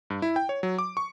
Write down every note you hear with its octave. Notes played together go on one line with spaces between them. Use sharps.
G2
E4
G5
C#5
F#3
D6
C#6